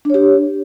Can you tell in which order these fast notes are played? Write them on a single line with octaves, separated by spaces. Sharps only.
D4 C#5 G4